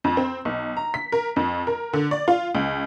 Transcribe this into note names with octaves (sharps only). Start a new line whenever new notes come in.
F2
C4
B1
A#5
B6
A#4
F2
A#4
D3
D5
F4
C#2